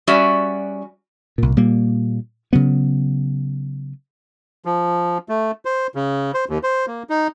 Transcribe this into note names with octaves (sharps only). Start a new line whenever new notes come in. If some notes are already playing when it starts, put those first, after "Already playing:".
G3 C#4 F#4 D5 E5
C2 A#2
A#2 G3 A#3
C#3 F#3 B3
F3
A3
C5
C#3
C5
D#2
C5
A#3
D#4